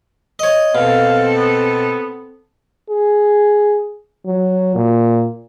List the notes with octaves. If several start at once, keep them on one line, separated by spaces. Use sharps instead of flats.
C#5 D#5
B2 C4 A4 F5
B3
G#4
F#3
A#2